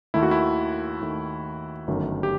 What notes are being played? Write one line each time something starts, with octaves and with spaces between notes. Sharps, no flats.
D#2 D#3 A3 E4
F#4
E4
D#2 D#3 A3
G1 F#2 D#3 F#3 A3
G4